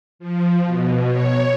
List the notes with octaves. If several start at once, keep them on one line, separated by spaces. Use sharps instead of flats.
F3
B2
C#5